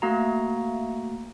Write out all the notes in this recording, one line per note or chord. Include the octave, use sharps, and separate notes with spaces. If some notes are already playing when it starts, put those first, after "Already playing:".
A3 A#3 F#4 A#5